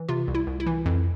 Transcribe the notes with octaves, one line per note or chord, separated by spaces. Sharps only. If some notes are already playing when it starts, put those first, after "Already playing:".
Already playing: E3
C3 F4
C2
E4
C2
E4
E3
F2